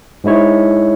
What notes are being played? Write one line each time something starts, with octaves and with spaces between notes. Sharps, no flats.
G#2 G#3 E4 C#5